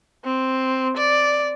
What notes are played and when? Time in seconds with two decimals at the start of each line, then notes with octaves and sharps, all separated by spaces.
0.24 C4
0.97 D5